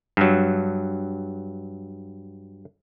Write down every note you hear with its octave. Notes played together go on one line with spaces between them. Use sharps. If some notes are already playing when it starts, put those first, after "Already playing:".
G2 F#3